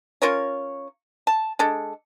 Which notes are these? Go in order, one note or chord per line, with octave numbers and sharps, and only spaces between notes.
C#4 F4 A#4 C#5
A5
G#3 D4 A4